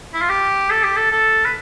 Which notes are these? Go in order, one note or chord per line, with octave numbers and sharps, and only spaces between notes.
E4
F4
G4
A4
G4
A4
A4
B4